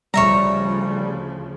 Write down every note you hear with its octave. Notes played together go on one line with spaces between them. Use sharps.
D2 C#3 F3 G3 C#5 E5 A#5